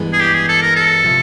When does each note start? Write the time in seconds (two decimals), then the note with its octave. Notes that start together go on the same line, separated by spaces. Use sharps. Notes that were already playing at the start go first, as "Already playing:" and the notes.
Already playing: G2 E3 G#3 B3
0.13 G#4
0.21 G4
0.34 G#4
0.49 A4
0.62 A#4
0.76 A4
1.05 C3 F3